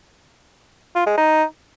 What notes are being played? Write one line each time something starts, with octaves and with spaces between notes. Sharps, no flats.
F4
G#3
D#4